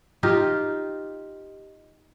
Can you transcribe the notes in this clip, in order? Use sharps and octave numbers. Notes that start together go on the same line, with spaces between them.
D#4 F4 G4 D#5